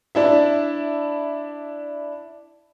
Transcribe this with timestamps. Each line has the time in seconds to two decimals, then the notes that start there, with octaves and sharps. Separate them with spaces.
0.15 D4 E4 E5